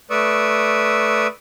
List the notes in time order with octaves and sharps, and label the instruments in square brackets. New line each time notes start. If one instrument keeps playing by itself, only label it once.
[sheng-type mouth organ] A3 B4 D5 C#6 D#6 E6